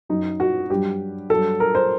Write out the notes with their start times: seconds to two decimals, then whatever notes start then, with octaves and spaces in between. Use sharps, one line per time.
0.09 F#2 F#3 D#4
0.40 F#4
0.70 G2 F#3 G4
1.30 G2 F#3 A4
1.60 A#4
1.75 C5